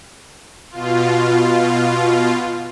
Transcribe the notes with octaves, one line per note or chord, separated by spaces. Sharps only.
B2 F4